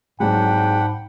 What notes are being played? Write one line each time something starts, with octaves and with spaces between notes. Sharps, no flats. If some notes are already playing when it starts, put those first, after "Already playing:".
C2 G#2 F#3 G#3 D4 F#5 G5 B5